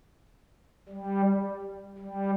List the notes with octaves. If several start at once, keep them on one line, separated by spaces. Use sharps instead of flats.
G3
G3